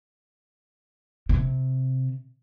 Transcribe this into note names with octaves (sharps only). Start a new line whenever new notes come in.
C3